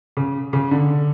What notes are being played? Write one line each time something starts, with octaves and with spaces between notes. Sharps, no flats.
C#3
C#3
D3